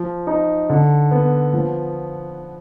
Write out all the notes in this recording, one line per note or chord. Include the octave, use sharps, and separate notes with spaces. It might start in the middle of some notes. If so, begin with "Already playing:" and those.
Already playing: F3
D#4
D3
B3
F3